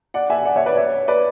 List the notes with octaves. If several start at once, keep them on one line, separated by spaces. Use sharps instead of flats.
D5 F#5
E5 G#5
D5 F#5
C#5 E5
B4 D5
C#5 E5
B4 D5